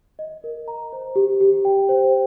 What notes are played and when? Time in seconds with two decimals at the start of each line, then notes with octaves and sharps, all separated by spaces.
0.19 D#5
0.44 A#4
0.68 A#5
0.93 C5
1.16 G4
1.41 G4
1.65 G5
1.89 C5